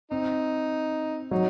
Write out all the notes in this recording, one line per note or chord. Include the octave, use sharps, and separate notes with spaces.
C4 D#4
F#3 D#4